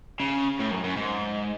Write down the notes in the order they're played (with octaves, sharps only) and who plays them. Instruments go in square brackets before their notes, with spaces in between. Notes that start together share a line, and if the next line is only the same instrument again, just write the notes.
[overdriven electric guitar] C#3
A2
F#2
F#2
G#2